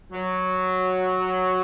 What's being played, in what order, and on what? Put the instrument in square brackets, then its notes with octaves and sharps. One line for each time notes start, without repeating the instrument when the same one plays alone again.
[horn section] F#3